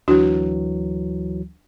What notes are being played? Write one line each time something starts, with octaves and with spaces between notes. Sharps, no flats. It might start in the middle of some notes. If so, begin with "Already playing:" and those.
D2 E3 F#3 D4 F#4